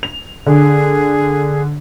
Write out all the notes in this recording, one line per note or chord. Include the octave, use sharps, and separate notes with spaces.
F7
D3 G#4